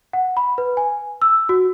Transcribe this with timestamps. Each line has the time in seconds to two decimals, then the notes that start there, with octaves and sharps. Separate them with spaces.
0.13 F#5
0.37 B5
0.58 B4
0.77 G#5
1.22 E6
1.49 F#4